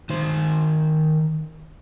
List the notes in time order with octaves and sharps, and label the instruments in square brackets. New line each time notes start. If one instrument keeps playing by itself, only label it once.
[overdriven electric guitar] D#3 C5